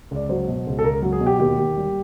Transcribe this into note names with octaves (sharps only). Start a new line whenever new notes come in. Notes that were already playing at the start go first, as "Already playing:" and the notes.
C#2 D5
F#3 C5
B2
C#2
A4
C#2 A#4
F#3
G#4
B2
G4
D#2 G4
D#2
G3